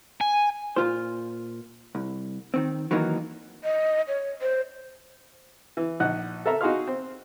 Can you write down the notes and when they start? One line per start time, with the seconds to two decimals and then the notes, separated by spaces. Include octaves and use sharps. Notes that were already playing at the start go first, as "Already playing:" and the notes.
0.21 G#5
0.76 A#2 F4 C5
1.95 C2
2.54 D#3 C4
2.91 D#3 E3 F#3 A#3 D#4
3.64 D#5
4.08 C#5
4.42 C5
5.77 E3
6.00 A#1 D#4 F#5 F#6
6.46 A4 A#4 E5 A#5
6.61 D#4 F#4 G#4 F5 C6 F6
6.87 C4